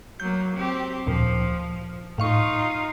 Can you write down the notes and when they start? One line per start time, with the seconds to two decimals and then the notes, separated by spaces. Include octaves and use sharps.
0.20 F#3 A#3 G6
0.56 C4 G4
1.07 D2 A#2 F3
2.18 A2 D#4 F4 F5 C#6